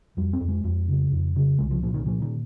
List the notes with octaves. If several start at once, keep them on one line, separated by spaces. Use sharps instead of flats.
F2 G3
C4
F2
G#3
F2
C#3
F2
C#3
C2 G#3
F3
A#2 F3
D#3
A#2 F3
D#3